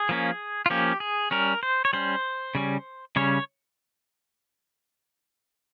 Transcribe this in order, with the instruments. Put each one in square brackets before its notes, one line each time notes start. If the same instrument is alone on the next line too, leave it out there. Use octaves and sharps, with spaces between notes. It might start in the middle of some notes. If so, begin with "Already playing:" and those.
Already playing: [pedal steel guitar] G#4
F3 A#3 C#4
F4
F3 A#3 C#4 G4
G#4
G3 C#4 A#4
C5
C#5
G3 C#4 C5
C#3 G3 C#4
C#3 G3 C#4 C#5